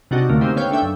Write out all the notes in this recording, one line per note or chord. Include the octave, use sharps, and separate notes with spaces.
C3 D4 D#4 F#4
D2 A2 D3 A3 A#3
C#3 G#3 A#3 C4 D#4 G4
B3 C#5 F5 G5
A3 D4 E5 G5
F#2